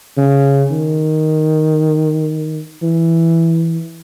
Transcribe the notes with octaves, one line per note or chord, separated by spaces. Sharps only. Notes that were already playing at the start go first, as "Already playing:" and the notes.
C#3
D#3
E3